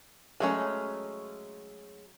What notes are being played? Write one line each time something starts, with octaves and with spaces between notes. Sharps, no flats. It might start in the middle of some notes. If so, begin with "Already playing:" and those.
F#3 G#3 A3 B3 C#4